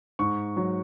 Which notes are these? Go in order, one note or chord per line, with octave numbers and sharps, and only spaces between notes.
G#2 C#6
F#3